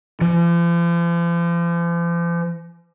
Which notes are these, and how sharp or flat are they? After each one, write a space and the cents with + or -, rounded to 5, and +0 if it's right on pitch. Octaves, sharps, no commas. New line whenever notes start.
F3 -40